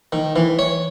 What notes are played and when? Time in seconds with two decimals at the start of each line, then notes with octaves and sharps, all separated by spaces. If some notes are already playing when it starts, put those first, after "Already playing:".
0.12 D#3
0.36 E3
0.59 C#5